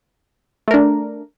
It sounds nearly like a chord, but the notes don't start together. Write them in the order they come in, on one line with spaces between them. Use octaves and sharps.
A3 A#4 D4